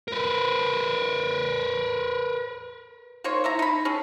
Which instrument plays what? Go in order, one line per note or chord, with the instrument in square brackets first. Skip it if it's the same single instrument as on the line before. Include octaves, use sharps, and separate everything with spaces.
[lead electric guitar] A#4 B4
[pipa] A#3 D#4 C5 C#5
E4 E5 A#5
D#4 B5
C#4 G#4 A4